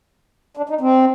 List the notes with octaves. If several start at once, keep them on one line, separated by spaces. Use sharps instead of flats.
D4
D#4
C4